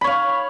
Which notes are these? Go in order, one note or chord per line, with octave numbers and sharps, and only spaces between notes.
C#5 F5 B5